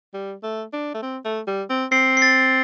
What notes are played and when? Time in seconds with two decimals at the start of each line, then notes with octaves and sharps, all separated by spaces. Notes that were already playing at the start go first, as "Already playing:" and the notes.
0.14 G3
0.43 A3
0.73 D4
0.94 A3
1.02 C4
1.25 A3
1.47 G3
1.70 C4
1.92 C4 C7
2.17 C7
2.22 A6